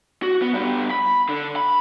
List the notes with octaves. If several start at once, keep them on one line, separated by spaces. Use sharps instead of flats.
F#4
B3
G3 B3
B5
D3
B5